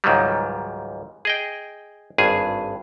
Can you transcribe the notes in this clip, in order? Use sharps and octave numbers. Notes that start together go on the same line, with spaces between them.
C#2 G#2 D#3 F#3 G3
G#4 D#5 G5
G#1 G2 G#4 G#5